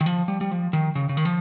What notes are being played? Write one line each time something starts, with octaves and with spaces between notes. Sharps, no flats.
D#3
F3
G3
G3
F3
D#3
C#3
C#3
D#3
F3